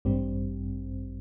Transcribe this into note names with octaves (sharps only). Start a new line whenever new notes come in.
A1 G2 G3 C4